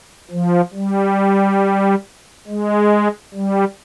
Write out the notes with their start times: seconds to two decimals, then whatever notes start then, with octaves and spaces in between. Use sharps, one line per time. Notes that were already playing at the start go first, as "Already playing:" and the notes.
0.31 F3
0.74 G3
2.48 G#3
3.34 G3